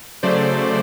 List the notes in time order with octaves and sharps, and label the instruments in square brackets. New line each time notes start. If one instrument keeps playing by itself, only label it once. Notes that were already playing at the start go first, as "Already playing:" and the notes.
[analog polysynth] C#3 F#3 A3 C5 D5